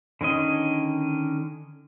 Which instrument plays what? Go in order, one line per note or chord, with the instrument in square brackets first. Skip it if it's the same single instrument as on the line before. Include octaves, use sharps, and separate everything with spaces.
[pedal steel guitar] D3 D#3 C#4 D#5